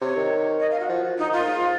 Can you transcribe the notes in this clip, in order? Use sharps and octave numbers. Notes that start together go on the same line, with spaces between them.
C3 C#5
D#3
D#5
F5
F#4
F3
F3
D#4
D#3
F4
A#2
G#2